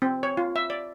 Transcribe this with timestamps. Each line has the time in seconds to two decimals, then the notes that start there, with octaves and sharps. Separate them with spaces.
0.02 C4
0.23 C#5
0.37 F4
0.56 E5
0.70 D5